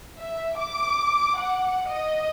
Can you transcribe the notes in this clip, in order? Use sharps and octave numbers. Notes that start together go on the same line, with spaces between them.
E5
D6
F#5
D#5